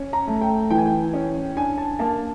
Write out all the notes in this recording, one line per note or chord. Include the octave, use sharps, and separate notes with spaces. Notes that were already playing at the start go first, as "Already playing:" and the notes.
Already playing: C#4
A#5
A3
G5
E3 G5
G#5
G5
C#4
D4 G#5
A5
A#3 A5